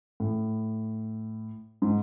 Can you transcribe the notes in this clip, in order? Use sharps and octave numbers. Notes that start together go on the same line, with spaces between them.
A2
G#2